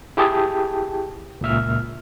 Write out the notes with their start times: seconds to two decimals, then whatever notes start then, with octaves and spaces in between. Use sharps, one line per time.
0.17 E4 G4 G#4 G5 A5
1.41 C#2 A#2 E5 F6